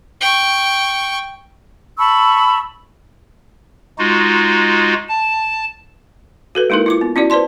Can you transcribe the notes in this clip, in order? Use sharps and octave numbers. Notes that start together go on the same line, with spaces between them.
G5 C#6
A5 B5 C#6 E6
G#3 D#4 F4 F#4
A5
F#4 A4 B4
G#3 A#3 D#4 E4 A#4
E4 F4 D6
B3
C#4 E4 F#4 D5
B4 C5 D5 A5 C6